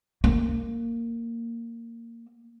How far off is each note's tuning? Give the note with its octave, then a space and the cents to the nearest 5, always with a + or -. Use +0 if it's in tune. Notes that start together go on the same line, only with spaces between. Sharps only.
A#3 -10